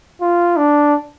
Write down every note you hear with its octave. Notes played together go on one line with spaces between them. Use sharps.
F4
D4